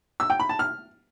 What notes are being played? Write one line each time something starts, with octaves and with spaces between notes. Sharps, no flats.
E6
G5
B5
A5
F6